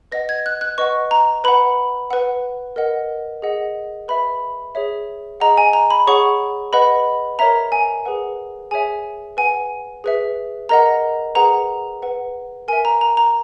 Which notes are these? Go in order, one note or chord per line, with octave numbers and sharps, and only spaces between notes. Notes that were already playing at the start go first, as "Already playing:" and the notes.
B4 D#5 F#5 A#6
G#6
F#6
F#6
B4 D#5 F#5 C#6
A#5
B4 F#5 B5
B4 F#5
A#4 D#5 F#5
G#4 D#5 F#5
B4 E5 B5
G#4 C#5 E5
G#4 D#5 F#5 A#5
G#5
A#5
B5
G#4 C#5 F#5 C#6
B4 D#5 F#5 B5
A#4 C#5 E5 A#5
G#5
G#4 B4 F#5
G#4 C#5 E5 G#5
B4 F#5 G#5
G#4 B4 E5
A#4 D#5 F#5 A#5
G#4 B4 F#5 A#5
B4 F#5
A#4 E5 G#5
A#5
A#5
A#5